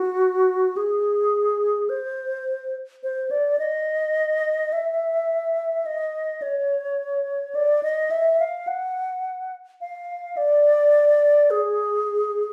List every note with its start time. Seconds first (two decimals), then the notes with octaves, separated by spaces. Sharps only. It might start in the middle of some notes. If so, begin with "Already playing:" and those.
Already playing: F#4
0.76 G#4
1.89 C5
3.03 C5
3.31 D5
3.59 D#5
4.72 E5
5.86 D#5
6.42 C#5
7.55 D5
7.83 D#5
8.11 E5
8.40 F5
8.67 F#5
9.81 F5
10.37 D5
11.50 G#4